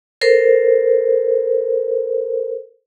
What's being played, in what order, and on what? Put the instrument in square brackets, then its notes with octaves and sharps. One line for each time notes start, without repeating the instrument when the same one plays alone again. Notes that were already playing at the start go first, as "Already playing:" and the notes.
[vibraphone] A4 A#4 C5